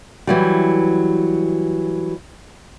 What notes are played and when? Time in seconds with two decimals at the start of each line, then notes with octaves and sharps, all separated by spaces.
0.27 E3 F#3 G3